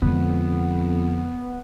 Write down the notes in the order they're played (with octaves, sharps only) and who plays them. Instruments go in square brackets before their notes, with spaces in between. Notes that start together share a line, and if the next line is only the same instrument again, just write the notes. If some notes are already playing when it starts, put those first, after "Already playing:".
[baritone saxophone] F2 [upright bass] D3 G#3 [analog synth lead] B3